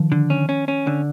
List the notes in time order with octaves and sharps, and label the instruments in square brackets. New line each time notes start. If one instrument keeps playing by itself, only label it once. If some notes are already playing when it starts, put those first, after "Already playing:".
Already playing: [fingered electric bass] D#3 F3
[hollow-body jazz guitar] D3
C#4
C#4
C#4
D3